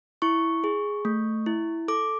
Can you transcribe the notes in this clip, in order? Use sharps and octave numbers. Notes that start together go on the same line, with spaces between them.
E4 C#6
G#4
A3
E4
A4 D6